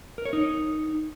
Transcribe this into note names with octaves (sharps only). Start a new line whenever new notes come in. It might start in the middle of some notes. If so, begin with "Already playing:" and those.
A#4
C#5
D#4